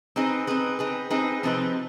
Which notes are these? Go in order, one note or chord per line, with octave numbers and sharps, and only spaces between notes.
C4 D#4 G#4 B4
C4 D#4 G#4 B4
C4 D#4 G#4 B4
C4 D#4 G#4 B4
C3 F3 C4 D#4 B4